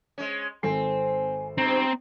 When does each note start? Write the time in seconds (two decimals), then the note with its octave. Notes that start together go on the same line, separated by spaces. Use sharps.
0.18 G#3 C#4
0.63 G#1 C4 A4 G#5 C7
1.58 G2 B2 C4 A#5